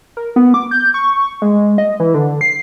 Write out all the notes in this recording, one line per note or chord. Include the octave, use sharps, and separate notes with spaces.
A#4
B3
D6
G6
C#6
G#3
D#5
E3
D3
C7